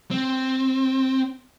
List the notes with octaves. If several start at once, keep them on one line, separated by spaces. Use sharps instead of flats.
C4